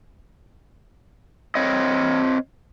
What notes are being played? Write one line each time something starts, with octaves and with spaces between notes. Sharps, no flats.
C4 C#5 D#5